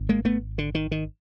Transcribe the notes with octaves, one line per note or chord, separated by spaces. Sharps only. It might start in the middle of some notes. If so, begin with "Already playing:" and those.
Already playing: G#1
G#3 A#3
A3 B3
D3
D#3
D#3